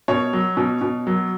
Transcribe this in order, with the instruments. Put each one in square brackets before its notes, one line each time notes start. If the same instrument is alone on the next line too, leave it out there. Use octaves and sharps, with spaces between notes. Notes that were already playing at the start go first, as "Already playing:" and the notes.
[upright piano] B2 C#5
F#3
B2
B2
F#3